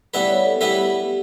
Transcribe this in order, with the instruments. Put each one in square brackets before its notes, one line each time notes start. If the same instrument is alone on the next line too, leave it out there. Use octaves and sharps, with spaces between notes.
[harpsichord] G3 B3 E4 B4 [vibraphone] D5
[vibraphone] C#5
A4
[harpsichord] G3 B3 E4 B4 [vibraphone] G4